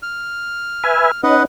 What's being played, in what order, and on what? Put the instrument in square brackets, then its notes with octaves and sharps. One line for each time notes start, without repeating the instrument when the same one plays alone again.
[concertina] F6
[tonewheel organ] B4 E5 G#5
[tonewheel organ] C#4 D#4 [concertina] B4 D#5 F#5